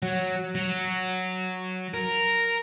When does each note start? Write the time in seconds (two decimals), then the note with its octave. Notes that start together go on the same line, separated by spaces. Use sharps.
0.03 F#3
0.55 F#3
1.94 A#4